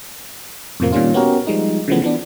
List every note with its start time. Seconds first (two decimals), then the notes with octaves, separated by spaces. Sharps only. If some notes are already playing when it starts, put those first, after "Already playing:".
0.80 F2 A2 C3 F3 A#3
0.92 A#2 D#3 G3 C#4 F4
1.14 B3 C#4 F#4 G4 A#4
1.47 F3 G3 G#3 D#4
1.88 C#3 E3 F3 A3 B3
2.02 E3 B3 D4